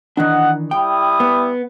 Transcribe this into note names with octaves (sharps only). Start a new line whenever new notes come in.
D#3 E3 D4 D#5 F#5
G3 E4 G5 D#6
B3